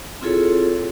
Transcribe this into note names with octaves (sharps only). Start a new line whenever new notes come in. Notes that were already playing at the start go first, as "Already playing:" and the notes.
C4 E4 F4 G#4 A4 C#5